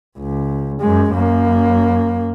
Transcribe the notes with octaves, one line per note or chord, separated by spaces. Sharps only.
C#2
F#2 G#3
F#2 A#3